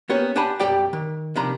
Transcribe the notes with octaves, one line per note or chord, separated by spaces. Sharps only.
A#3 B3 C#4 G4 C#5
D4 G4 F#5 G#5 A5 B5
B1 F#2 G3 G4 D5 G5
D#3
C3 D#3 F3 D4 A#5 B5